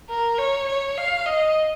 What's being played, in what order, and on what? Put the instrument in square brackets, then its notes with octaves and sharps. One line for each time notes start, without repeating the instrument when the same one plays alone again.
[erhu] A#4
C#5
C#5
F5
D#5